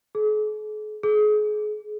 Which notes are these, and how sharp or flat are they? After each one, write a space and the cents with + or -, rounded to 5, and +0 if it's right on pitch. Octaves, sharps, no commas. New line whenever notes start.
G#4 +45
G#4 +30